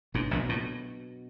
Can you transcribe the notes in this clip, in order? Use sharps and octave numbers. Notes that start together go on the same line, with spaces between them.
G#1 G#2 B2 F#3 B3 D4
A#1 A#2
A2